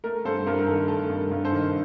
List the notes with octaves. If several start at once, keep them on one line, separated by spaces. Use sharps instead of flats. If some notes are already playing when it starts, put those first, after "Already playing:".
A3 A#4
G2 A4 C5
G2 A#4
A#4
D#3 A4
A3 A4
G2
A#4
G2
A4 C5
D#3